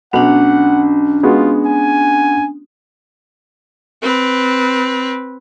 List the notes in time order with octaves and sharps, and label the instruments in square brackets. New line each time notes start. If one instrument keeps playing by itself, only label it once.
[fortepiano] B1 [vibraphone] C#4 D4 [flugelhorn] F#5
[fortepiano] G#3 B3 F#4 [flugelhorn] F4
[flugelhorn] G#5
[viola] C4 B4